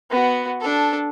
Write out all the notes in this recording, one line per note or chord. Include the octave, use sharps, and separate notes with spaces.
B3 F#4
D4 A4